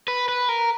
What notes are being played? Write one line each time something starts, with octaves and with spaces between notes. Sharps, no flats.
B4
B4
A#4